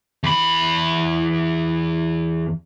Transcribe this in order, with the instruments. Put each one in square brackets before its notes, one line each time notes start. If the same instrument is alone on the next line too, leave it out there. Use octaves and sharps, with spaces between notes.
[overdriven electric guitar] E2 B5